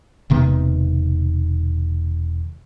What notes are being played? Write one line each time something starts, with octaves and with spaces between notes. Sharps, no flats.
E1 C3 D#3 B3